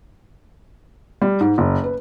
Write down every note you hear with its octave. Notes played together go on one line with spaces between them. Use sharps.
G3
G#2
F#1
B4